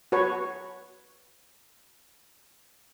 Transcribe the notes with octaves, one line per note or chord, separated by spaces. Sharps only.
F#4 B4 C#5